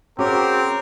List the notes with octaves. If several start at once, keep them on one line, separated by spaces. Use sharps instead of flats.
C4 C#4 F#4 G#4 A#4 D6